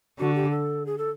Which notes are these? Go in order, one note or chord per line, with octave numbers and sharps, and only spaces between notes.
D3 F#4
G4
A4
G#4
A4